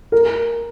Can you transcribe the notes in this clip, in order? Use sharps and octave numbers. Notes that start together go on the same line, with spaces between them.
A#4